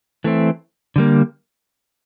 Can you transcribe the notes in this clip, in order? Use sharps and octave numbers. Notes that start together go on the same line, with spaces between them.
E3 A3 C4
D3 G3 A#3